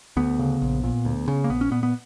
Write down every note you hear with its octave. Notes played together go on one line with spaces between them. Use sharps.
D2 B3
C#3
A#1
A#2
D2
C#3
A#3
A#1 B3
C#4
A#2 B3
B3